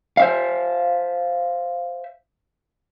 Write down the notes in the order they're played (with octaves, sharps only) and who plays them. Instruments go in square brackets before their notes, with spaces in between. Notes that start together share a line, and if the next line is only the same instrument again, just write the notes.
[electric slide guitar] C5 E5 F5